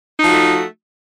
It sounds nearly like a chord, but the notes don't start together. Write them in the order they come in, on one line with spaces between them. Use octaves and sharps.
D#4 F3 F#4 A3